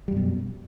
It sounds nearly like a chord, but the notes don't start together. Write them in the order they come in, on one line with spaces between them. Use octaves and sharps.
G3 F#2 B2